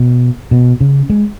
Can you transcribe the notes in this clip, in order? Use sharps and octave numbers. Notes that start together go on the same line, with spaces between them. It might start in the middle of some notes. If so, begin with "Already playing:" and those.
Already playing: B2
B2
C#3
G#3